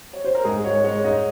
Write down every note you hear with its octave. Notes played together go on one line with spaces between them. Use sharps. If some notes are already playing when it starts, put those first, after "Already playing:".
C#5
C5
A#4
G#2 G#4
G#3 C#5
G#3 C#5
G#2 D#5